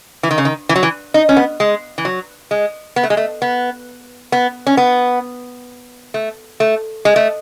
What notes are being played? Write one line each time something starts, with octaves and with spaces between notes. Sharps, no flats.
E3
D#3
C#3
D#3
E3
F#3
E3
D#4
C#4
B3
G#3
E3
F#3
G#3
B3
A3
G#3
A3
B3
B3
C#4
B3
A3
A3
G#3
A3